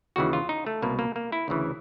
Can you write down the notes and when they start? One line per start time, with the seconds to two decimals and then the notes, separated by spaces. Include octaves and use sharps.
0.16 D#2 C#3 E3 F#4
0.33 F4
0.49 D#4
0.67 A3
0.82 C2 B2 A#3
0.99 A#3
1.16 A#3
1.32 E4
1.48 D2 C#3 E3